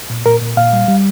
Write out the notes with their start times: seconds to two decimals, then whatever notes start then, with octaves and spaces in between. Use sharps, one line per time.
0.10 A#2
0.26 A#2 A#4
0.41 A#2
0.57 A#2 F5
0.73 G3
0.88 G3